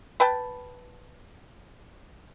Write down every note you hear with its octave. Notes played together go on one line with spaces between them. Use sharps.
B4 G5 A5